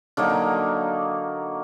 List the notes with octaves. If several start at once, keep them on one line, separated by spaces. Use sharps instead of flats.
D3 F#3 A#3 D#4